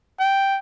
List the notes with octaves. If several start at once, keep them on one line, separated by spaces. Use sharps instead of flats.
G5